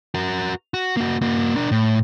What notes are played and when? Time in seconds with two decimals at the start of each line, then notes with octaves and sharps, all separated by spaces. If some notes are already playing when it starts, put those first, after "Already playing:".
0.14 F#4 A#4
0.74 F#4
0.97 A#3 F#4
1.21 A#3 F#4
1.56 D4 A#4
1.72 A2